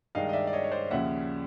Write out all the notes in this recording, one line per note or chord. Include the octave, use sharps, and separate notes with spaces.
G2 D#3 G#3 D#5 F5
D#5
D5 E5
D5
C#5 D#5
C#5
C5 D5
D#2 C#3 F3 E5 F#5